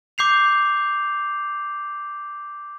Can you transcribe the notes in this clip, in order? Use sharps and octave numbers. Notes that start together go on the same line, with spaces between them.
D6 G6 C7 F7